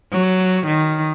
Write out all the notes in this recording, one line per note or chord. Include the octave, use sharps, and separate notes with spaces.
F#3
D#3